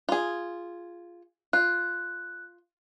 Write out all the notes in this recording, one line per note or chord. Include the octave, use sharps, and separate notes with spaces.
F4 G#4
F4 F#6